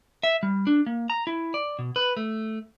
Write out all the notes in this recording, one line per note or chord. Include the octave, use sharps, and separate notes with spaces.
E5
G3
D4
A#3
A#5
E4
D5
B2
B4
A3